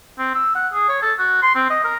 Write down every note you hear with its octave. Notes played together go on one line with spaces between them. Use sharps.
C4
E6
F#5
G#4
C#5
A4
F#4
C6
C4
D#5
A#4